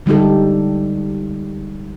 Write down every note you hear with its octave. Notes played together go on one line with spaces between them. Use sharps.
D3 G3 G#3 D#4 G4 A4